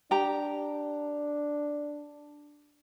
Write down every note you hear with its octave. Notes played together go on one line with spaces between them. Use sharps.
D4 G4 A#5